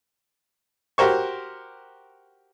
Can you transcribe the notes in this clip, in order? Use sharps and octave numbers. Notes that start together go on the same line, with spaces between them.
F#4 G4 A#4 C5 C#6